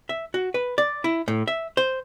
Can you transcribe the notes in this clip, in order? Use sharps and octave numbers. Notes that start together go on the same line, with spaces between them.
E5
F#4
B4
D5
E4
A2
E5
C5